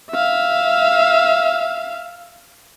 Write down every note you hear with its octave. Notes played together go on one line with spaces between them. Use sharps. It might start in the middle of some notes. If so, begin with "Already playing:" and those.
E5 F5